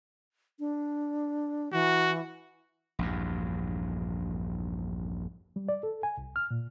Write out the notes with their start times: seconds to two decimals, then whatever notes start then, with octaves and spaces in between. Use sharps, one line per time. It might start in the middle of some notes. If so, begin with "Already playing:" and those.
0.59 D4
1.73 E3 F#4
2.99 A#1 E2 G2
5.56 G3
5.69 D5
5.83 A4
6.03 G#5
6.18 C2
6.36 F6
6.51 A#2